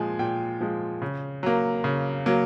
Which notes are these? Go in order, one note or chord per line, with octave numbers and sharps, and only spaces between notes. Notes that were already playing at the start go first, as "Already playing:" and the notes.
Already playing: A#2 F3 G#3 G#5
A#2 G5
F3 G#3
C#3
F#3 A#3
C#3
F#3 A#3